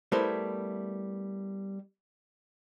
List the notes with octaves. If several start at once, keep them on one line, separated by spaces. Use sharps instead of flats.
G3 A3 B3 E4 A#4 C5